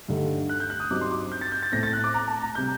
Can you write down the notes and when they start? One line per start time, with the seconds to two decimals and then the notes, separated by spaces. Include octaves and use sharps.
0.08 G2 D3 A3 D#4
0.49 F#6
0.60 G6
0.70 F#6
0.80 D#6
0.90 G2 F#3 C4 D#4 D6
1.01 C6
1.11 D6
1.32 G6
1.41 A6
1.52 G6
1.63 A6
1.72 A2 A3 C4 A#6
1.83 A6
1.93 F#6
2.04 D6
2.14 A#5
2.28 A5
2.42 A#5
2.55 C3 G3 G6